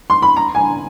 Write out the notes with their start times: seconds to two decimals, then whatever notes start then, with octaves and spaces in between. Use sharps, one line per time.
0.10 C6
0.22 B5
0.36 A#5
0.55 G#5